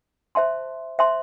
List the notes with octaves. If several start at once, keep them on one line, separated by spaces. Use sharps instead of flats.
C5 E5 A5 C6
C5 E5 A5 C6